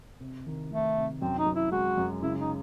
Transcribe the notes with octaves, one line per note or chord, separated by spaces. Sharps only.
C3
D#3
D#3 A3
C3
F#2 C4
D#4
F#2
E4
G#3 F#4
F#2
C#3 E4
D#4